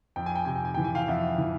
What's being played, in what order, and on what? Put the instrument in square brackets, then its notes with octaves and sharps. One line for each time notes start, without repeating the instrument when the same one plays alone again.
[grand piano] F2 G5
G#5
G5
C3 G#5
G5
G#5
E3 G5
G#5
F5 G5
F2 E5 F#5
E3